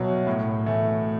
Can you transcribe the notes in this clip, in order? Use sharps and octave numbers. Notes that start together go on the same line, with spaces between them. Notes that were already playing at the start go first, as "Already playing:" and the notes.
Already playing: C2 B2 F#3
A2
E3 A3